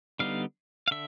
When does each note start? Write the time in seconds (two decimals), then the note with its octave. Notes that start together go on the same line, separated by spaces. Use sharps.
0.19 D3 G3 B3 D#4 F5
0.88 F5
0.91 D3 E5